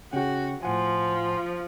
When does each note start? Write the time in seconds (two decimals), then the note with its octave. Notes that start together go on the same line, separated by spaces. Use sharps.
0.13 C#3 C#4 F#4 G5
0.63 A2 F3 F#5 G#5